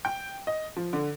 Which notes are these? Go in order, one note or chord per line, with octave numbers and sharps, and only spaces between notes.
G5
D#5
F3
D3